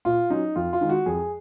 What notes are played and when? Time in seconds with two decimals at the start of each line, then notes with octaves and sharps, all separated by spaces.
0.05 A#2 F4
0.30 F#3 C#4 D#4
0.56 F2 F4
0.73 F4
0.81 D#3 G#3 D#4
0.89 F#4
1.06 F2 G#4